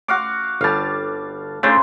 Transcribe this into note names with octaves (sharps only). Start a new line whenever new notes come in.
F#4 F5 D6
G1 G3 F5 A5
C#3 A3 D4 F4 C5